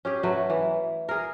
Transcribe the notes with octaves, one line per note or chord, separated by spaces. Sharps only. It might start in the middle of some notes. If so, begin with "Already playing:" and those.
C#4 G4 G#4
F#3 A3 B4
E3
G#4 A#4